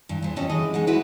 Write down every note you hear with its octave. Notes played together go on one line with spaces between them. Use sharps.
G2 E3
E2 E3 C5
F2 C3 C#4 A4 D#5
F#2 E3 G#3 D4 D#5
G#3 D#4 F#5
E4 F#4 B4 C5 E5 F#5